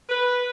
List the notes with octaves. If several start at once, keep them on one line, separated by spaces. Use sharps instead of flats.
B4